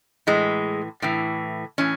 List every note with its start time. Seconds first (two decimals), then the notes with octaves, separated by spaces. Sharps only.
0.27 A2 E3 G#3
1.02 A2 E3
1.78 A2 E3 C#4